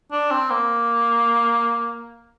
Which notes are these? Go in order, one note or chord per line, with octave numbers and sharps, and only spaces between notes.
D4
C4
A#3